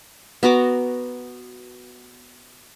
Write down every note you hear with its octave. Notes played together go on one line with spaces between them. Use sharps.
B3 F#4 A#5 D6